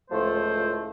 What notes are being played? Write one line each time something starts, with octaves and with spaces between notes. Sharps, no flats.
C#2 A2 F3 A3 C5